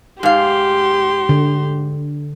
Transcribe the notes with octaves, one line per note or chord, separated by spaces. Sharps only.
G#2 G4 F5 C6
D3